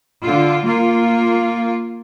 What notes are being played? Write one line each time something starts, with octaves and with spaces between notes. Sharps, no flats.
D3 F4
A#3 F4